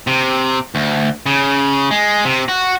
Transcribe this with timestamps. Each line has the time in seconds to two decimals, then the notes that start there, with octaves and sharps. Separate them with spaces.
0.07 C3
0.75 D2
1.26 C#3
1.91 G#3
2.25 C3
2.48 F#4